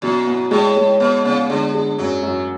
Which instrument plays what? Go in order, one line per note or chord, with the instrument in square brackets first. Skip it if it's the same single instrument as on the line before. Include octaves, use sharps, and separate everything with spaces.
[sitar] F#2 [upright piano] B2
[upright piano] B3
[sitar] A2 [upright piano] G#3
[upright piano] G#3
[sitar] B2 [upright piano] B3
[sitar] C#3 [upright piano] B3
[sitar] D3 [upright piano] G#3
[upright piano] G#4
[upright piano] F#2 [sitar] F#3
[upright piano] F#2